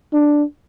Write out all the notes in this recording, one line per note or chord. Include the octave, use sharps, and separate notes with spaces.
D4